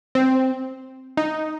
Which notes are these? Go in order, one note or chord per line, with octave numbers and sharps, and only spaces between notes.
C4
D#4